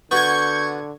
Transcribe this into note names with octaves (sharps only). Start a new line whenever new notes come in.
D3 B3 F#4 C#6 G6 G#6